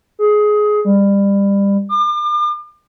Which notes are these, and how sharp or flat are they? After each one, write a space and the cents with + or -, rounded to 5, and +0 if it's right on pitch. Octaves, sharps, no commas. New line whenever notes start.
G#4 +15
G3 +25
D6 +40